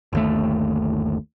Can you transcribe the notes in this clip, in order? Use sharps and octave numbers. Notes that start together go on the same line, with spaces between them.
G1 D#2 A3